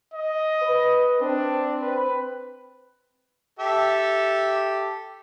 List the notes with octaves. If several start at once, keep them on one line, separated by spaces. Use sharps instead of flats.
D#5
B4
C4 D4
B4
G4 A4 E5